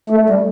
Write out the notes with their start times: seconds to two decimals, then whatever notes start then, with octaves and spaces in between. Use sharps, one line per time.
0.10 A3
0.30 G3